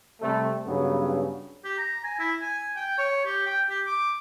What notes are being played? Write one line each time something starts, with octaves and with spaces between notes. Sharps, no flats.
C3 G3 A3
G2 C#3 F#3 B3
G4
A#5
G#5
E4
G#5
G5
C#5
G4
G5
G4
D6